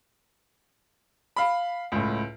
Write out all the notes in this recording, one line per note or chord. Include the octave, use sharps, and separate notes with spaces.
F5 B5
C#2 A2